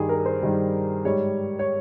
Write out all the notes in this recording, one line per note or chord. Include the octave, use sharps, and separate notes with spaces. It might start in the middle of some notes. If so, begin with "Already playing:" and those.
Already playing: G2 D#3 G3 G#4
A#4
C5
G2 D#3 G3
G#2 G3 C#5
C#5